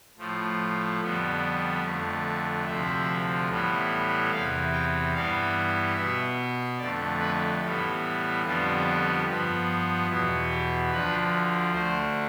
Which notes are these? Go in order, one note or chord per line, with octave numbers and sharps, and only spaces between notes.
A2 F3 A3
F2 D3 G3 B3
F2 D3 A3
D2 C3 F3 E5
A2 E3 G3 B3
E2 C3 E3 F5
G5
G2 E3 G3 B3 F5
B2 B3 E5
F2 D3 A3 D5
B4
A2 E3 G3 B3 A4
F2 D3 G3 B3 F4
G2 F3 B3
E2 B2 B3 E4
G4
D2 D3 F3 B4
D2 D3 A3 C5